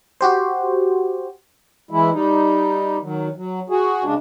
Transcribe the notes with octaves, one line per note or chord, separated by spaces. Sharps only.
F#4 G4 C5
E3 G#3 E4
G3 D#4
D#3 F#3
F#3
F#4 G#4
C#3 G#3 D4